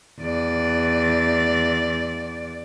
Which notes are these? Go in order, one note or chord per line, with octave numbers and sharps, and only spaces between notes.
E2 D5